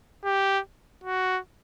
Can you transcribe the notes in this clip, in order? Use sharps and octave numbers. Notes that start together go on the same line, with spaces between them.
G4
F#4